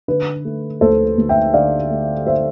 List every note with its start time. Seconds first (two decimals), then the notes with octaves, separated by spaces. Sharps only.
0.08 D3 B4
0.45 A3
0.81 D2 A4 C5
1.18 D2
1.29 E5 G5
1.54 D3 D5 F5
1.90 A3
2.27 C5 E5